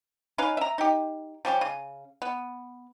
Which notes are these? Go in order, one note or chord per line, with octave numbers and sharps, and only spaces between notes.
C#4 D#4 B4 F5
E5 A#5
D#4 G4
F3 G3 C#4 G4
C#3
B3